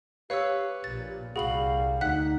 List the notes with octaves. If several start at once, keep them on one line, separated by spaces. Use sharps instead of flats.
G4 B4 C#5 F5 E6
A#1 A#2 A6
C2 G3 F#4 G#4 F5 B5 F#7
D2 D#4 F#5 F#6 B6